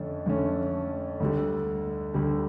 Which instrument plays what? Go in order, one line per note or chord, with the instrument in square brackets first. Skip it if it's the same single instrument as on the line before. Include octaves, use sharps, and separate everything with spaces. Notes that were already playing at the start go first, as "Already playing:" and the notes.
Already playing: [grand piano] F2 D3 A3 C#4
F2 D3 A3 C#4
D2 D3 G3
D2 D3 G3